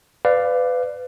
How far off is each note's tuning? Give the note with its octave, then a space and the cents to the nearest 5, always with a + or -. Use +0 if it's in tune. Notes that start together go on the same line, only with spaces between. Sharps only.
B4 +25 D5 +5 F5 +0